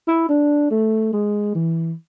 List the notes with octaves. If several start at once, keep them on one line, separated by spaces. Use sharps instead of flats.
E4
D4
A3
G#3
E3